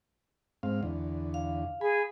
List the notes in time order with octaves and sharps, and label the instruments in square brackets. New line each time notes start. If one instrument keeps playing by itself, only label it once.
[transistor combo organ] G#2 C4 F5
E2 D3
[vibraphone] F5
[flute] G#4 [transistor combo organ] G#5 B5